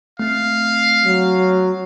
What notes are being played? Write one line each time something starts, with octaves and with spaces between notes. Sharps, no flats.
A3 C4 F5
F#3